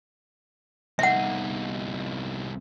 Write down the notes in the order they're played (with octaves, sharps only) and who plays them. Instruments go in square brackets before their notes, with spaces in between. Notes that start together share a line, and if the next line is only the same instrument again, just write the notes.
[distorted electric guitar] C2 D#4 [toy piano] E5 F#5